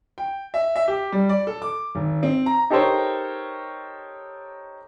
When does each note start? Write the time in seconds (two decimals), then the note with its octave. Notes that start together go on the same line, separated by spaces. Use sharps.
0.18 G5
0.54 E5
0.76 E5
0.88 G4
1.12 G3
1.29 D5
1.47 A4
1.62 D6
1.95 G#1
2.23 C4
2.46 A#5
2.70 D#4 G4 A4 A#4 C5 C#5